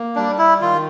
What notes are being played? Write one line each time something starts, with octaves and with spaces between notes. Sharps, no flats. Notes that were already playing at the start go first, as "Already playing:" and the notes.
Already playing: A#3
G3 D4
E4
D#3 F4